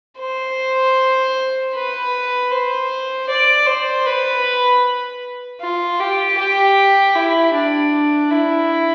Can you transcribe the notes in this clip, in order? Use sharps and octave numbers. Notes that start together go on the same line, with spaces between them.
C5
B4
C5
D5
C5
B4
F4
G4
G4
E4
D4
E4